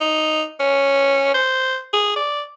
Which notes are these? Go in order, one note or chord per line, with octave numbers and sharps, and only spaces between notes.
D#4
C#4
C5
G#4
D5